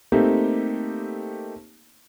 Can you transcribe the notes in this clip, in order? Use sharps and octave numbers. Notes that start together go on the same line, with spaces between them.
A3 A#3 C4 D#4 G4